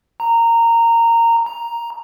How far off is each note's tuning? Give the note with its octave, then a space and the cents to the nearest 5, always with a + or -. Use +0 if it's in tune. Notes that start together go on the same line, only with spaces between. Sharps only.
A#5 -15
A#5 +5